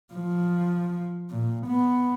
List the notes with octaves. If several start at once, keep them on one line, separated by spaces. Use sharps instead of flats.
F3
A#2
B3